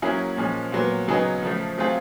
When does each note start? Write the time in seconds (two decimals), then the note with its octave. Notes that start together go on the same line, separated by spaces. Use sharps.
0.02 F#3 A#3 C#4 E4 G#4
0.37 A#2 F3 G#3 C#4
0.72 A#2 F#3 B3
1.08 C#3 F#3 B3 D#4 G#4
1.42 C#3 F3 A3
1.78 F#3 A3 C4 F4 G#4